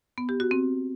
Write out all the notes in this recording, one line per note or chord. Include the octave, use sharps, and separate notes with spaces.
B3
G4
F#4
C4